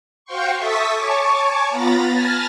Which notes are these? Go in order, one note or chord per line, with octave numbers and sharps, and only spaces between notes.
F#4 C5 F5 G5 C6 C#6
A4 E5 C#6 D#6 A6 B6
C#5 G#5 A5 C#6 D6
B3 F4 A#5 B5 A6 A#6
G#5 A5 B5 F6 A6 A#6